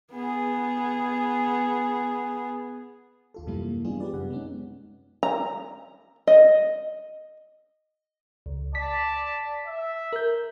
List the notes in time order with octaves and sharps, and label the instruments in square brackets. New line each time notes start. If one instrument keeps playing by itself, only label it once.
[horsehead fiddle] B3 G#4
[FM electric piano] D#2 F4 A4
F#2 C3 E3 G3 A#3 E4
G3 G#3 B3 D4 F4 G#4
B3 G4 B4 D5
F#2 C3 F#5
G#3 B3 C#4 D#4
[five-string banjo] A#5
D#5
[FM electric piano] C#2
[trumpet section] D5 A5 [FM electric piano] B6
[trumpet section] E5
[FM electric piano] A#4 G6